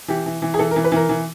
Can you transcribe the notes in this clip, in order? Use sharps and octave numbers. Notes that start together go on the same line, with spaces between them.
E3 G4
E3
E3
G#4
E3 A4
A#4
E3
B4
E3 A#4
E3